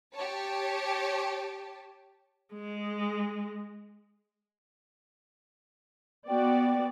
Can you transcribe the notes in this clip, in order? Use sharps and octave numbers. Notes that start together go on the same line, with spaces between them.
G4 C#5 A5
G#3
B3 F#4 D5 G5